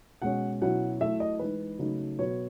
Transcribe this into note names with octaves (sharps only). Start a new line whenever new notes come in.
B2 G#3 C#4 F#5
B2 F#3 C#4 E4 F#5
F#3 A3 E4 E5
D#5
E3 G#3 D#4 B4
C#3 F#3 A3 D#4
B2 F#3 B3 C#5